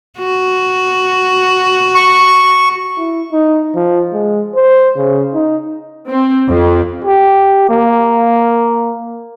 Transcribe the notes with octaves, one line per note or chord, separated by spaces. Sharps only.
F#4
C#6
E4
D#4
F3
G#3
C5
C#3
D#4
C4
F2
G4
A#3